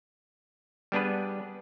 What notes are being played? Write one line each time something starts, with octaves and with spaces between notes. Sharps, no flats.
G3 B3 D4 G#4 B4